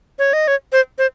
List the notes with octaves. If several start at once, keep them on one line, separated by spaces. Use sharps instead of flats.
C#5
D#5
C#5
C5
C5